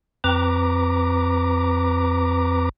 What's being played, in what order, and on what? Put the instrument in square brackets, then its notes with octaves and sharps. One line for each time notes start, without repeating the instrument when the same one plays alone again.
[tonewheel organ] F2 C4 B4 A#5 D6